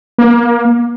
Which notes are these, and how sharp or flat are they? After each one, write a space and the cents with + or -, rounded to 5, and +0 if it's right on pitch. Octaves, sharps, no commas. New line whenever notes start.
A#3 +30